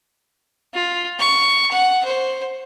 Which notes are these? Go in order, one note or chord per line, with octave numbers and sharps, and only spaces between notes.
F4
C#6
F#5
C5